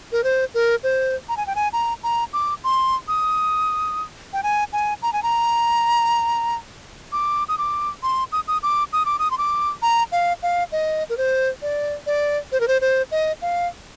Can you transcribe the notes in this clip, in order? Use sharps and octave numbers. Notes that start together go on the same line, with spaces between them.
A#4
C5
A#4
C5
A#5
G#5
G5
G#5
A#5
A#5
D6
C6
D#6
G5
G#5
G#5
A#5
G#5
A#5
D6
D#6
D6
C6
D#6
D#6
D6
D#6
D6
D#6
C6
D6
A#5
F5
F5
D#5
A#4
C5
D5
D5
C5
A#4
C5
C5
D#5
F5